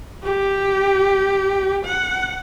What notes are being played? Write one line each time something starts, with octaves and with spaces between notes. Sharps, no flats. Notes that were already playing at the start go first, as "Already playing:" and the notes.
G4
F#5